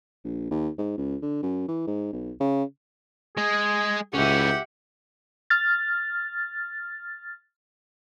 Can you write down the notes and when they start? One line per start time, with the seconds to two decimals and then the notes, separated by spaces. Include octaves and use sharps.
0.24 A#1
0.51 D#2
0.78 G#2
0.98 C#2
1.22 D3
1.43 F#2
1.68 E3
1.87 G#2
2.13 B1
2.40 C#3
3.37 G#3 G#4
4.14 C#2 E3 C#4 G4 E5 F#5
5.50 F6 A6